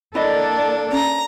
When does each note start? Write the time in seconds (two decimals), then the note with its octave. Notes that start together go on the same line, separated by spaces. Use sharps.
0.15 A#3 D4 E4 A4 D5 D#5
0.92 C#4 A#5